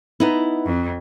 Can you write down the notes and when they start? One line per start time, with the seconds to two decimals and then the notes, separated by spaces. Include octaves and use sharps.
0.20 B3 D#4 E4
0.66 F2